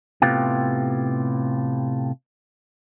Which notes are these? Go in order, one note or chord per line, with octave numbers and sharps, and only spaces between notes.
A2 C3 B3 F4 G4